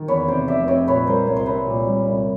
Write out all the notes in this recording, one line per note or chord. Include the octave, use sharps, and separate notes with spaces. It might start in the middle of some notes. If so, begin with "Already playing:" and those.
Already playing: D#3
E2 B4 C#5
C3 C5 D5
F1 D5 E5
C4 C#5 D#5
A#2 B4 C#5
G3 A#4 C5
C2 C#5
C5
C4 B4 C#5
A#2
G3
C2